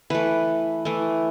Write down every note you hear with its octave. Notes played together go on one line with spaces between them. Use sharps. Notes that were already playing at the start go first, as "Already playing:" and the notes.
E3 A3 B4
E3 A3